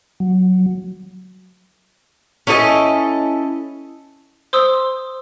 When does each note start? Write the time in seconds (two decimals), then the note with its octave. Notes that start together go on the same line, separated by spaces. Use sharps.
0.20 F#3
2.47 C#4 E4 A4 D#5
4.53 C5 C6 D#6 E6